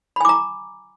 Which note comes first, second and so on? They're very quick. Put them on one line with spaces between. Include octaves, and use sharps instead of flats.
B5 G#5 D6 A#5